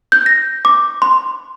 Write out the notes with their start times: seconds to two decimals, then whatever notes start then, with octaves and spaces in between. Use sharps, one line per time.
0.12 G6
0.26 A#6
0.65 D6
1.02 C6